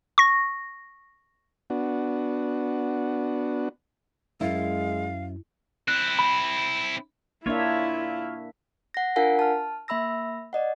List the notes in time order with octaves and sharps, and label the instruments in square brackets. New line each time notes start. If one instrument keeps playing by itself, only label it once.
[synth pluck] C#6 A#6
[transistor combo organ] B3 D4 F#4
[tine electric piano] F#2 [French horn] G#3 [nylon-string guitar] E4 [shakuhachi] F5
[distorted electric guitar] C4 E4 [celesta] F#6
[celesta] B5
[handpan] A#3 D4 E5 [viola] E4 [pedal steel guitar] F4 C#5
[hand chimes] F#5 A#6
D4 F4 A#4 F5 F#5 G#5
A5 F6
A#3 E5 B5 E6 A#6
D5 D#5 F#5